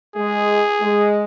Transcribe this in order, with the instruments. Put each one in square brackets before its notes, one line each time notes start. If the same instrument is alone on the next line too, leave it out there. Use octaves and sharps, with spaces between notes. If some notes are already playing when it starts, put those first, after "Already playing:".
[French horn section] G#3 [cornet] G#4
[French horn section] G#3